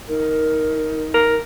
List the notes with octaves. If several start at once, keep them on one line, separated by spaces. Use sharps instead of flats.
D#4 A#4
A#4